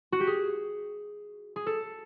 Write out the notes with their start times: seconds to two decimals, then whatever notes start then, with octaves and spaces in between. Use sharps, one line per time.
0.12 F#4
0.20 G4
0.27 G#4
1.56 G#4
1.66 A4